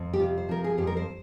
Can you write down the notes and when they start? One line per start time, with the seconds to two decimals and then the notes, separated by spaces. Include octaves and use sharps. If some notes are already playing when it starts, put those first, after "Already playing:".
Already playing: F2
0.13 G4
0.20 C3 F4
0.38 C5
0.49 F3 A#4
0.64 G#4
0.78 F2 G4
0.87 A#4
0.97 C5